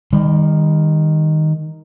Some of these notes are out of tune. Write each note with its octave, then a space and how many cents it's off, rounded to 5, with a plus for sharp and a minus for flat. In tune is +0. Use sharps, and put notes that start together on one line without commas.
D#3 +0 G3 +40